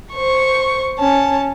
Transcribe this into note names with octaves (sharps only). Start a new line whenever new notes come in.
C5 C#6
C#4 A5